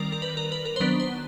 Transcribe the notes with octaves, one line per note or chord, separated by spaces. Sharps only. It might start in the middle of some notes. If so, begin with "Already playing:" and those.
Already playing: D#3 G3 C4 A#4 D5
A#4
B4
A#4
B4
A#4
C5
D#3 F#3 B3 D4 B4
C5